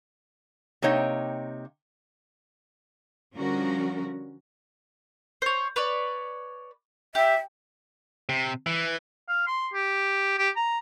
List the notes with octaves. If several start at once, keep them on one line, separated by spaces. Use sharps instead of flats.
C3 A#3 D#4 C#5 D#5 G5
D3 F3 G3 C#4 F#4 A#4
C5 C#5
B4 C#5 D5
G4 E5
C3
E3
F5
C6
G4
G4
A#5